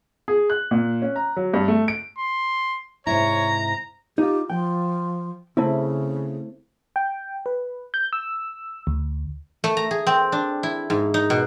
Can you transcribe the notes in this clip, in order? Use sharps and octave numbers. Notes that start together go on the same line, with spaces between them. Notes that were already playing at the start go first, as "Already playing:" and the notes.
G#4
F#6
A#2
C#4
A#5
F#3
G2
A3
D7
C6
G#2 C3 E4 C#5 A#5
D#4 F4 G4
F3 G5
C#3 A3 C4 E4
G5
B4
G6
E6
D2
A3
A#5
G#4
C4
D4
E4
G#2
D#4
B2